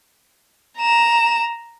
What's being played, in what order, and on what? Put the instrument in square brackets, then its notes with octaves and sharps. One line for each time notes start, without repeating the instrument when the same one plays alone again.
[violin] A#5 E7